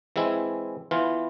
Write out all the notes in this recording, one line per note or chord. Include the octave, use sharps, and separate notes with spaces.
E3 G#3 C4 E4
E3 B3 F4